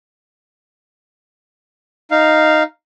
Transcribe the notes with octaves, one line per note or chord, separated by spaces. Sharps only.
D#4 F5